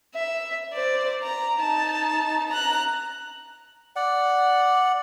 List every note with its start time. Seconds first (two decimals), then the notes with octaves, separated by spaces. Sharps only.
0.15 E5
0.73 C5 D5
1.23 A#5
1.60 D#4 A5
2.49 A#5 F#6
3.96 D5 F#5